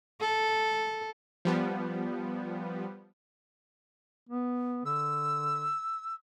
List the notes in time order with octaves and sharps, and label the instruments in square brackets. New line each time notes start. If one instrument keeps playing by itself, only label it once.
[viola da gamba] A4
[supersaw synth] F3 G3 B3
[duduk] B3
[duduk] D3 [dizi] E6